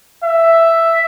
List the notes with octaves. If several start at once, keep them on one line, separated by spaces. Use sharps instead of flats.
E5